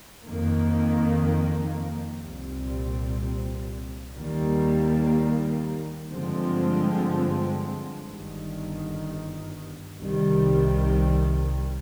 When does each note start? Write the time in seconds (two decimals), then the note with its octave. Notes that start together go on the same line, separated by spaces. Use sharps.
0.25 F2 D#3 A#3
2.20 C2 A#2 G3 C4
4.15 D#2 D#3 G3 A#3
6.10 G2 D3 F3 G#3 C4
8.04 G1 G2 D#3
9.99 C2 C3 D#3 G3